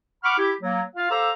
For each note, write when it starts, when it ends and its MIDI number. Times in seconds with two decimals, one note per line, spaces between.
0.24 0.34 78
0.24 0.34 83
0.24 0.34 85
0.24 0.34 86
0.24 0.34 89
0.38 0.53 64
0.38 0.53 67
0.62 0.83 54
0.62 0.83 58
0.96 1.11 65
0.96 1.11 77
1.11 1.31 67
1.11 1.31 69
1.11 1.31 72
1.11 1.31 77
1.11 1.31 82
1.11 1.31 88